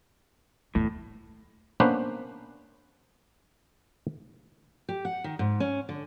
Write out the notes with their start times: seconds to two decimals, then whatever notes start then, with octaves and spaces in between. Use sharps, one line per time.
0.75 E2 A2
1.80 A#3 B3 C#4 D4 B4 C5
4.89 G4
5.05 F#5
5.24 D#3
5.39 G#2
5.60 C#4
5.89 D3